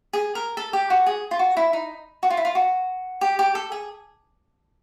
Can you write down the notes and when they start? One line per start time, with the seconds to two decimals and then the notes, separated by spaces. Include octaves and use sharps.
0.13 G#4
0.35 A#4
0.57 A4
0.73 G4
0.90 F#4
1.06 G#4
1.31 F4
1.39 F#4
1.57 E4
1.73 D#4
2.23 F#4
2.30 F4
2.37 E4
2.45 F4
2.55 F#4
3.21 G4
3.39 G4
3.55 A4
3.72 G#4